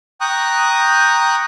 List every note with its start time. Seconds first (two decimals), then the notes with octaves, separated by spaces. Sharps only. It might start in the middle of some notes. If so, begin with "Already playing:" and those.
0.21 G5 A#5 C#6 D#6 F#6